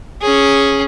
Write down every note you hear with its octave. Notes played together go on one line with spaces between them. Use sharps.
C#4 G#4